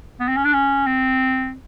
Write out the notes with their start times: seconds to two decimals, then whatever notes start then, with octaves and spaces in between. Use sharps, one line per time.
0.20 B3
0.28 C4
0.36 C#4
0.45 D4
0.53 C#4
0.86 C4